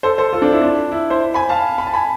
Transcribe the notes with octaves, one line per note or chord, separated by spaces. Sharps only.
A4 C5
A4 C5
F4 A4
D4
E4
D4
E4
C5 E5
G#5 B5
F5 A5
B5
A5
G#5 B5